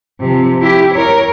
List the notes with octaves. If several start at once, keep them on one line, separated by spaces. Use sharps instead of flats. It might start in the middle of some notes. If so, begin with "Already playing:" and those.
C3 F3
E4 G4
A#4 C#5